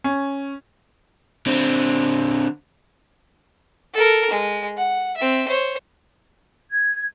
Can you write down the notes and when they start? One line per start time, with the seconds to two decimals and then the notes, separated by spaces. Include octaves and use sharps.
0.04 C#4
1.47 D3 C4
3.94 A4 A#4
4.31 G#3
4.77 F#5
5.17 C4 E5
5.48 C5 C#5
6.70 G#6